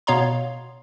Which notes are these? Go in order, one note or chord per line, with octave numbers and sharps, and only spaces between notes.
B2 B3 C#5 F5 A#5 C6